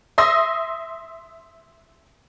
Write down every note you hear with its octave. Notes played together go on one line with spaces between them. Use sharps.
E5 C6 D#6 E6 A#6